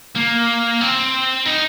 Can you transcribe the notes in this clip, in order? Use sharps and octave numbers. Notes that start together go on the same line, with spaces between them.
A#3
C4
D#4